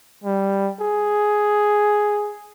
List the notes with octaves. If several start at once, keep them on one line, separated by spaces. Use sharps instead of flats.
G3
G#4